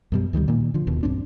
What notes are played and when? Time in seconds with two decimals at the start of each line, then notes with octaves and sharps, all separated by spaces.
0.12 F#2 B2 G3
0.33 D2 D#3 F3 G3
0.48 A#2 D#3 A#3
0.74 D3 F3
0.87 D#1 D#2 B2
1.03 B1 G2 C4 D4